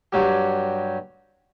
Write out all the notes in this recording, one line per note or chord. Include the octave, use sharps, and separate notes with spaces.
G2 F#3 G4